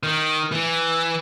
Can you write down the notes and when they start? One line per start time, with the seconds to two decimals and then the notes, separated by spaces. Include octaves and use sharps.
0.03 D#3
0.52 E3